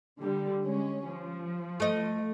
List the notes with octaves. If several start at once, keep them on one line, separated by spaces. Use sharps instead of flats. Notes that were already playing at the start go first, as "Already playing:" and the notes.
D3 G3
G#3 C#4
F3
A3 D#5